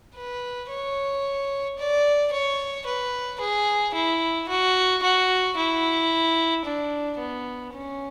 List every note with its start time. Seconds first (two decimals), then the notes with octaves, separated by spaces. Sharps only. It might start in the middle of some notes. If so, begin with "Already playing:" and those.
0.16 B4
0.71 C#5
1.78 D5
2.32 C#5
2.86 B4
3.41 G#4
3.95 E4
4.49 F#4
5.03 F#4
5.57 E4
6.65 D4
7.19 B3
7.73 C#4